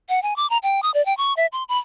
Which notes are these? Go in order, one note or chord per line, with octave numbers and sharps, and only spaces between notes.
F#5
G#5
D6
A#5
G5
D#6
D5
G5
C#6
E5
C6
B5